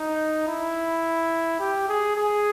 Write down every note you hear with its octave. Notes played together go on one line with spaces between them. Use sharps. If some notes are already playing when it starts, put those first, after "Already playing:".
Already playing: D#4
E4
G4
G#4
G#4